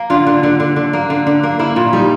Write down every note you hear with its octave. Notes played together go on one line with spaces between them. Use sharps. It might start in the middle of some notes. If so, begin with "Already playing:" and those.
Already playing: A#3
D3 F4
D3
D3
D3
D3
A#3
D3
D3
A#3
A#3 E4
A#2
G3 D#4